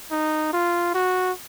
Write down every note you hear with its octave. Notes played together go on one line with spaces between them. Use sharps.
D#4
F4
F#4